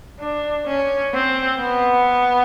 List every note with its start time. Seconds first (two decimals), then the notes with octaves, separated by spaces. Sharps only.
0.19 D4
0.67 C#4
1.14 C4
1.60 B3